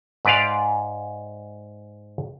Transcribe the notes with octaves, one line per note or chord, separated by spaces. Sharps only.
G#2 B4 D5 F5